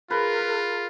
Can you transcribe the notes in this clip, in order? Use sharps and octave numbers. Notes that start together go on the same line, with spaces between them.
F4 G#4 A#4 B4